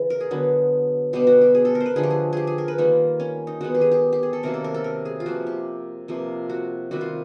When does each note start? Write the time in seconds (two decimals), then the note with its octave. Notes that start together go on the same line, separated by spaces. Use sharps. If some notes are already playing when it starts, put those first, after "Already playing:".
Already playing: C#3 E3
0.10 A#4
0.21 G#4
0.31 D3 F#3 B3
1.13 B2 G3 B3 G4
1.27 F#4
1.41 G4
1.55 G#4
1.65 A4
1.75 A#4
1.80 C5
1.86 B4
1.96 D3 F3 A3 G#4
2.03 G4
2.10 G#4
2.33 G4 G#4
2.47 G#4
2.58 A#4
2.68 B4
2.78 D#3 G3 A#3 F4
3.20 C#4
3.47 D#4
3.61 D#3 G#3 B3 F#4
3.75 G4
3.81 G#4
3.92 G4
4.13 G4
4.23 G#4
4.33 A4
4.43 C3 D#3 F#3 A#3 A#4
4.54 A4
4.64 A#4
4.74 A4
4.84 A#4
5.05 G#4
5.20 F4
5.26 C3 F3 A#3 F#4
5.47 G4
6.08 C3 F3 A#3
6.50 F#4
6.91 C3 D#3 G3 F#4
7.01 F4